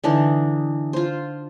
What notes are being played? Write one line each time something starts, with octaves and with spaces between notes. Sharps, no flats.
D3 E3 D4 D#4
F4 C5